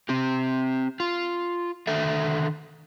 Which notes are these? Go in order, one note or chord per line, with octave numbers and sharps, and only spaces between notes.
C4 G4
F4
D3 D#3 A4 E5